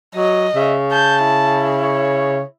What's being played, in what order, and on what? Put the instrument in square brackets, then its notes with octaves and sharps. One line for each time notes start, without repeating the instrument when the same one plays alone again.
[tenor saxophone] F#3 [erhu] D#5
[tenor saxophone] C#3 [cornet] E5
[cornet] A5 [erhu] G6
[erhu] E4
[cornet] C#5